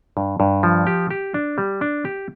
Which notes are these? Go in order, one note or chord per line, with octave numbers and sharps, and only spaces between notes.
G2
G2
F3
G4
G4
D4
G3
D4
G4